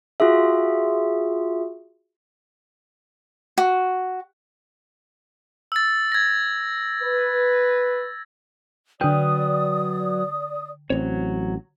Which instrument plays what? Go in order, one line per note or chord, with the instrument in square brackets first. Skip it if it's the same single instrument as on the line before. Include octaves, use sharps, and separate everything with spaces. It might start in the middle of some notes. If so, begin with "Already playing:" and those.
[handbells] F4 F#4 G#4 E5
[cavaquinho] F#4
[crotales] E6 A6
G#6 A#6
[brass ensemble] B4
[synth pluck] D3 G5 [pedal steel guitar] F#3 B4 F6 [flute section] D5 D#6
[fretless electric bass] A1 C4 [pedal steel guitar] F#3 C#5